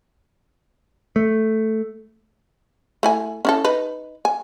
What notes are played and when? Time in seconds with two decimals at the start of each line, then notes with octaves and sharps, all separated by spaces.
1.16 A3
3.03 A3 E4 G#5
3.45 C#4 E4 A4
3.64 D#4 B4
4.25 G#5